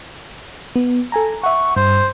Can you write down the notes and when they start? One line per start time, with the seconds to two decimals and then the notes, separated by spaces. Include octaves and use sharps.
0.76 B3
1.12 A4 G#5 A#5
1.43 E5 F#5 C#6
1.76 G2 C5